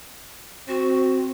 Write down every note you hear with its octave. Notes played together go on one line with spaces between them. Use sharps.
C4 F#4